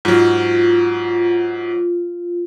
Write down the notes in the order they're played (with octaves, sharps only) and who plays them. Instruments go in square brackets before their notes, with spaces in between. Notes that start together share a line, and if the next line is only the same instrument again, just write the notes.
[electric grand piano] G#2 F#3 [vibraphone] F4